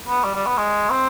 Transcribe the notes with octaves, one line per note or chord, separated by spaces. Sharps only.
B3
G3
G3
B3
G#3
C4